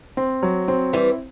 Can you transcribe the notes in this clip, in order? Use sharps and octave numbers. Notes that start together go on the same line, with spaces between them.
C4
F#3
C4
E3 G3 E4